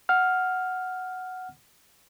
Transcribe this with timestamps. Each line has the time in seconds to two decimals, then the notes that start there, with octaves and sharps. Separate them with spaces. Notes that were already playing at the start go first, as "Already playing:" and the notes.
0.09 F#5 F6